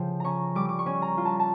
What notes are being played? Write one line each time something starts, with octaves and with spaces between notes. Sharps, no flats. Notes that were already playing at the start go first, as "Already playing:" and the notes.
Already playing: C#3 F3 G5
C#4 A#5 C#6
G3 D6
D6
C#6
C#4
A#5
F4
A5
A5